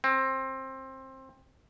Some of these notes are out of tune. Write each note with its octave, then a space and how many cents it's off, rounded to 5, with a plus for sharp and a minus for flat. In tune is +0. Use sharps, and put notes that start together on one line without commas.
C4 +20